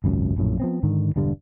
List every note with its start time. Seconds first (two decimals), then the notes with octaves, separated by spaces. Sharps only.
0.04 G#1 C#2 F#2
0.36 A#1 F#2 A2
0.60 F3 B3 C4
0.83 G#2 D3 D#3
1.16 E1 G2 D3 G3